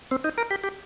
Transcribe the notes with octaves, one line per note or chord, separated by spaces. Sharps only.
C4
D#4
A#4
G4
G4